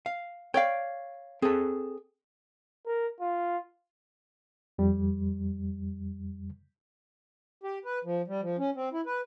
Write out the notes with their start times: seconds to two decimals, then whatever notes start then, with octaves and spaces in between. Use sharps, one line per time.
0.06 F5
0.54 C#5 D5 F5 G5
1.42 C4 G#4 A4
2.86 A#4
3.20 F4
4.78 F2 G3
7.63 G4
7.85 B4
8.05 F3
8.28 G3
8.41 F3
8.58 C#4
8.76 C4
8.93 E4
9.06 B4